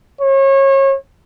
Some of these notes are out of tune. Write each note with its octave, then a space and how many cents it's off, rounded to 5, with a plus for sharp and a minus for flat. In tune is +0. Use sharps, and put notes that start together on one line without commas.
C#5 -30